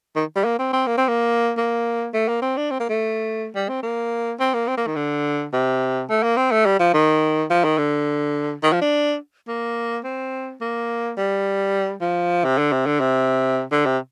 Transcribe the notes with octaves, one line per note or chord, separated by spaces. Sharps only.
D#3
G3
A#3
C4
C4
A#3
C4
A#3
A#3
A3
A#3
C4
D4
C4
A#3
A3
G3
C4
A#3
C4
A#3
C4
A#3
D#3
D3
C3
A3
A#3
C4
A3
G3
F3
D#3
F3
D#3
D3
D#3
F3
D4
A#3
C4
A#3
G3
F3
C3
D3
C3
D3
C3
D3
C3